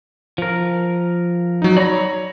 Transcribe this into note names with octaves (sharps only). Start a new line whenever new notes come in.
F3 A#4
F#3 D#4
C#5 D5 A#5 B5 A#6